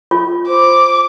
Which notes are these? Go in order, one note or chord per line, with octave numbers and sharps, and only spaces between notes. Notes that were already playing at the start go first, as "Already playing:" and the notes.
F4
C5 D6